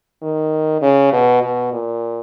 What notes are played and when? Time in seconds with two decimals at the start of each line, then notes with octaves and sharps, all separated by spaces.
0.23 D#3
0.82 C#3
1.13 B2
1.42 B2
1.73 A#2